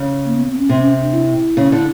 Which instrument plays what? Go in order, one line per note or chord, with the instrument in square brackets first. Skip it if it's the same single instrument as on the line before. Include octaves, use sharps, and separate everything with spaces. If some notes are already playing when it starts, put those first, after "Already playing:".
Already playing: [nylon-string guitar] C#3
[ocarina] A#3
B3
C4
C#4
[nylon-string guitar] C3 [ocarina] C4
[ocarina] C#4
D4
E4
[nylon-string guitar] C#3
D3